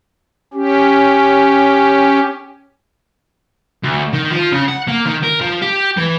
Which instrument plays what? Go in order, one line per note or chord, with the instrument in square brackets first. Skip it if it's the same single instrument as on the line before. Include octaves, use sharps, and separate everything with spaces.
[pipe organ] C#4 G4
[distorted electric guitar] D2
D#3
F3
C#3
F#5
A#3
D#3
A#4
F3
G4
E3